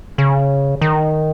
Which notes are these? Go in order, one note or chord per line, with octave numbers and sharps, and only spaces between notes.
C#3
D#3